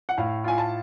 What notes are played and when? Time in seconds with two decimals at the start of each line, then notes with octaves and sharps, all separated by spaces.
0.09 F#5
0.17 A2 F5
0.44 F4 G#5
0.58 A5